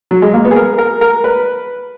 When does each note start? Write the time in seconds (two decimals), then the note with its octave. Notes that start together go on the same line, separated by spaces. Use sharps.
0.11 F#3
0.22 G#3
0.34 A#3
0.45 B3
0.51 G#4
0.56 A#4
0.78 A#4
1.01 A#4
1.24 B4